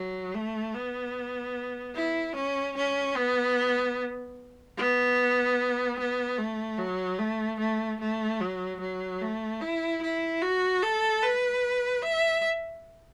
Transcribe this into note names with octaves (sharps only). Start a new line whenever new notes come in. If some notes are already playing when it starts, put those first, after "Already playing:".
Already playing: F#3
A3
B3
E4
C#4
C#4
B3
B3
B3
A3
F#3
A3
A3
A3
F#3
F#3
A3
E4
E4
F#4
A4
B4
E5